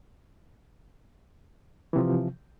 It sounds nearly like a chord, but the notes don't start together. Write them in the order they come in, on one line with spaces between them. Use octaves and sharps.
E3 C3 F3